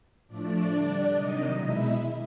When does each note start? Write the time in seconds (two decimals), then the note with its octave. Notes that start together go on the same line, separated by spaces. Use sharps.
0.27 A2 F3 A3 D4 D5
0.70 D3 G3
1.12 C3 D#3 F#3 D#4 D#5
1.55 B2 G#3 E4 E5